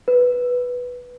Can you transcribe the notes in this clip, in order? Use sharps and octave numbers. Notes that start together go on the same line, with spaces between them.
B4